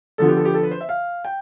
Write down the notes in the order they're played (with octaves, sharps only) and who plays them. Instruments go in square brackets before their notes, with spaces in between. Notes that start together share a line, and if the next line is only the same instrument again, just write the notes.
[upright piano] D3 F3 B3 [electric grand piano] A4
[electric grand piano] G4
A4
G4
A4
B4
C5
E5
F5
G5